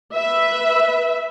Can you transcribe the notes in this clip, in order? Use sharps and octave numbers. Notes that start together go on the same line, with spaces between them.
B4 E5